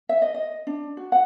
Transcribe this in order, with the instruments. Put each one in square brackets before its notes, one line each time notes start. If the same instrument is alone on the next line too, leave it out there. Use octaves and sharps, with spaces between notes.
[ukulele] E5
D#5
D#5
D4
F#4
F#5